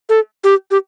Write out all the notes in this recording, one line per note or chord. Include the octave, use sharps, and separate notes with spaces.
A4
G4
G4